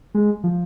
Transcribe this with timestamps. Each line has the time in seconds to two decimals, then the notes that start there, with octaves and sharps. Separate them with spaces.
0.15 G#3
0.44 F3